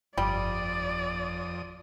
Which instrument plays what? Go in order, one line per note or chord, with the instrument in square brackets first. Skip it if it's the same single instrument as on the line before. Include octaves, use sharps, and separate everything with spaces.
[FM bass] G1 [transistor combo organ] F2 D#6 [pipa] G3 [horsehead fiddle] D5